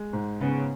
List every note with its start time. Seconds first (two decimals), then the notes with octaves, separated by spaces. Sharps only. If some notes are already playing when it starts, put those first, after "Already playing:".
Already playing: G#3
0.13 G#2
0.41 C#3 B3